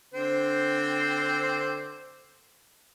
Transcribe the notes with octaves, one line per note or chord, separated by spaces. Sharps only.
D3 C4 C5